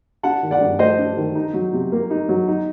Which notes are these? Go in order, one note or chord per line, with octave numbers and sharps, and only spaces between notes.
D4 F#5 A5
D#3
D5 F#5
G2
A3 C5 D#5
D4
D#3
D#4
F#3
C3
A#3
D#4
F#3
D#4